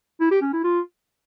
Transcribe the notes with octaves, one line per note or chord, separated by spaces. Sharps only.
E4
G4
C#4
E4
F4